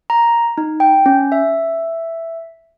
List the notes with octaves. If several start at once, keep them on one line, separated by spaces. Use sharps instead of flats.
A#5
D#4
G5
C#4
E5